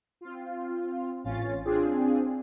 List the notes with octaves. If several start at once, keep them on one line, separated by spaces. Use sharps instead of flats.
C4 F4
A1 C#4 F4 A6
C4 D4 F4 G#4